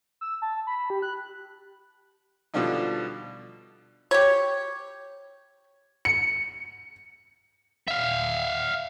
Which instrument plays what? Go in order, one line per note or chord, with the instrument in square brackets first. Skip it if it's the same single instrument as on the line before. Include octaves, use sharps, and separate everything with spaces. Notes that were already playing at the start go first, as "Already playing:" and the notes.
[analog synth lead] E6
A5
B5
G4
F#6
[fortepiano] B2 D3 F3 G3 D4 D#4
[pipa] G4 C#5
[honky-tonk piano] C#7
[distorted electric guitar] E5 F5